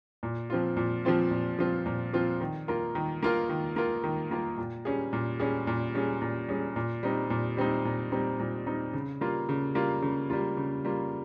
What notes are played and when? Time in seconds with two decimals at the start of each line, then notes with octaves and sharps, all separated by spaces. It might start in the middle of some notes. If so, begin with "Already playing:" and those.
0.23 A#2
0.50 F3 C4 F4
0.77 A#2
1.05 F3 C4 F4
1.31 A#2
1.59 F3 C4 F4
1.86 A#2
2.13 F3 C4 F4
2.41 D#3
2.68 A#3 F4 A#4
2.95 D#3
3.23 A#3 F4 A#4
3.49 D#3
3.76 A#3 F4 A#4
4.04 D#3
4.31 A#3 F4 A#4
4.58 A#2
4.85 G3 C#4 G#4
5.13 A#2
5.40 G3 C#4 G#4
5.67 A#2
5.95 G3 C#4 G#4
6.22 A#2
6.48 G3 C#4 G#4
6.76 A#2
7.03 G3 C4 D#4
7.30 A#2
7.57 G3 C4 D#4
7.85 A#2
8.12 G3 C4 D#4
8.39 A#2
8.66 G3 C4 D#4
8.93 C#3
9.21 G3 A#3 F4
9.49 C#3
9.75 G3 A#3 F4
10.02 C#3
10.30 G3 A#3 F4
10.57 C#3
10.85 G3 A#3 F4